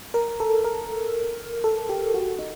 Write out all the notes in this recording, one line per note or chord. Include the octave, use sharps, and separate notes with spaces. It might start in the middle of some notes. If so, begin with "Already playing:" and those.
A#4
A4
A#4
A4
G4
F#4
D#4